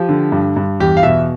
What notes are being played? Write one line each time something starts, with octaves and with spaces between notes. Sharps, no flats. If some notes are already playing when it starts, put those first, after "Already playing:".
Already playing: F3 G4
D3
G2
G2
E2 G4
F5
B2 E5